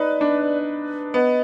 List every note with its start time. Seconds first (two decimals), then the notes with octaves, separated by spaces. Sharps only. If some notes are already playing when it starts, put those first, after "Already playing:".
Already playing: D#4 B4 D5
0.21 D4
1.14 B3 D#5